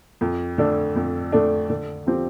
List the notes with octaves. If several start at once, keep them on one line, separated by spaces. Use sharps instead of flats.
F2
D3 A3 D4 A4
F2
D3 A3 D4 A4
D3
F3 C4 G4